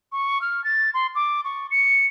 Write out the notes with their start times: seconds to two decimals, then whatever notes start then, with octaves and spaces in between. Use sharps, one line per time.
0.12 C#6
0.41 F6
0.64 A6
0.94 C6
1.15 D6
1.44 C#6
1.71 C#7